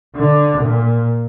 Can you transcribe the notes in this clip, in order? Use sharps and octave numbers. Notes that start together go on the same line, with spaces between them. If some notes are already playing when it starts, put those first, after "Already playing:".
D3
A#2